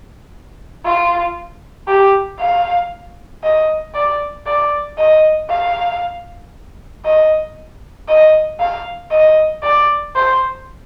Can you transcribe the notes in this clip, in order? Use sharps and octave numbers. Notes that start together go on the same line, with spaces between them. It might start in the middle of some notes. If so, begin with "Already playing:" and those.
F4
G4
F5
D#5
D5
D5
D#5
F5
D#5
D#5
F5
D#5
D5
C5